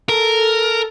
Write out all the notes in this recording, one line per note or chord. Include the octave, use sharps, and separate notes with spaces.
A4 A#4